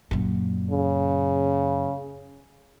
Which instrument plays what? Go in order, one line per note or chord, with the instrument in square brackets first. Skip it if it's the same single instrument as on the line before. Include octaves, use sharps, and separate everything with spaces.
[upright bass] F#2 A#2
[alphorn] C#3